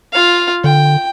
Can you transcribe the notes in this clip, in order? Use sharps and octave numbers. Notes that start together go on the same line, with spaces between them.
F4 F5
D3 G5